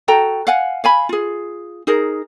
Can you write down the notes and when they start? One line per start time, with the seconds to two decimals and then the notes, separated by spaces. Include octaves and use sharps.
0.08 F#4 A4 G5 A#5
0.47 F5 F#5 G#5
0.84 F5 G#5 B5
1.09 F4 G#4
1.87 D#4 G#4 A#4